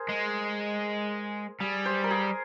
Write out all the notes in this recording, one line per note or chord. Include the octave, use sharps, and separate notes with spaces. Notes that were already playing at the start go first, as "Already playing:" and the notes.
Already playing: G#4 A#4 C5
G#3
G3 G#4
C5
A#4
G#4